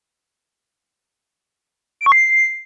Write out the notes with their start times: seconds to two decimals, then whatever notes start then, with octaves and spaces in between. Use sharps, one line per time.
2.01 D7
2.06 C#6
2.12 C7